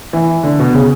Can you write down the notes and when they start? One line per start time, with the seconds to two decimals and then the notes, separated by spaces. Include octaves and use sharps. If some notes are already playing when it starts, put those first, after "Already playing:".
0.13 E3
0.43 D3
0.59 B2
0.74 C#3